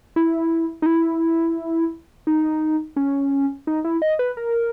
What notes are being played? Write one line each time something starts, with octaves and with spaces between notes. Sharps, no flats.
E4
D#4
E4
D#4
C#4
D#4
E4
D#5
B4
A#4